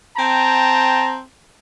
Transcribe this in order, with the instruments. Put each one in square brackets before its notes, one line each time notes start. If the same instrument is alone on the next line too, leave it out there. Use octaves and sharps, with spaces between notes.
[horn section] C4 G5 A5 A#5